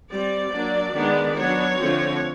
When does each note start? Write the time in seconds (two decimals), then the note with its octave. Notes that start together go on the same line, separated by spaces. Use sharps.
0.11 G3 C4 D5
0.53 F#3 A#3 D4
0.94 D#3 G#3 B3 D4
1.37 F#3 B3 D4 C#5
1.78 D3 F3 A3 C4